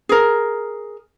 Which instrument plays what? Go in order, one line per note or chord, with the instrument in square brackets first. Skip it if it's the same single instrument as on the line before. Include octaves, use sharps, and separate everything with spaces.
[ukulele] G#4 A#4